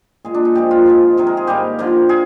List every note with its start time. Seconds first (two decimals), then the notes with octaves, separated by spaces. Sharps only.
0.25 A#2 G#3 G#4
0.34 D4
0.45 D#4
0.55 A#2 F3 G#3 G4
0.71 F4
0.86 G#2 F3 G#3
1.17 C3 D#3 G#3
1.27 A#4
1.37 G#4
1.47 G#2 G3 A#3 G4
1.79 D3 F3 A#3
2.09 G#4